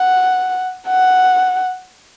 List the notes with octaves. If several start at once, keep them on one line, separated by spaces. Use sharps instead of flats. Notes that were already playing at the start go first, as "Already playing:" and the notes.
Already playing: F#5
F#5